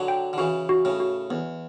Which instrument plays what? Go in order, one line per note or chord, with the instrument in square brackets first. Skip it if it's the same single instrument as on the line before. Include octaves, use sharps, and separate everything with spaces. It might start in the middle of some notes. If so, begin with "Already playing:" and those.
Already playing: [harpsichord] D3 F#3
[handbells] G5
[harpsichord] D3
[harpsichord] C#3 E3 [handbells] F#4
[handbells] F#4
[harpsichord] A2 C#3
[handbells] F#4
[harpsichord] E2 [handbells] B3